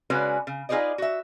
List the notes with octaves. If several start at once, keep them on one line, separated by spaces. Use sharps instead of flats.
C#3 G#3 C#4 F#4 B4 D5
C#3
D#4 F4 G#4 B4 D5 D#5
F#4 E5